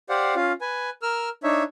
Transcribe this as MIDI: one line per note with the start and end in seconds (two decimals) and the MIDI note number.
0.09 0.35 67
0.09 0.35 72
0.09 0.35 74
0.09 0.35 77
0.09 0.35 78
0.36 0.52 61
0.36 0.52 65
0.36 0.52 77
0.61 0.90 71
0.61 0.90 80
1.02 1.29 70
1.02 1.29 88
1.02 1.29 89
1.43 1.63 62
1.43 1.63 63
1.43 1.63 73
1.43 1.63 76